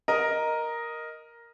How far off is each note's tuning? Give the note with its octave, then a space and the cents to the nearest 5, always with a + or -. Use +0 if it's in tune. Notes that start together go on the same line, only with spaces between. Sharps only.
A#4 +5 D#5 +0